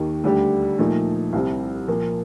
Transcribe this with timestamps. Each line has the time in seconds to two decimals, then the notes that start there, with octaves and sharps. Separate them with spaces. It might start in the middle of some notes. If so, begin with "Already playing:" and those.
Already playing: D#2 D#3 A#3 D#4 G4
0.24 D2 D3 G3 D4 G4
0.79 A#2 F3 A3 D#4
1.33 C2 C3 G3 C4
1.88 A#2 F3 A#3